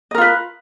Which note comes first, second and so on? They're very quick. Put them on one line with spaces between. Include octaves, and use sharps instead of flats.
D#5 A#4 F4 B4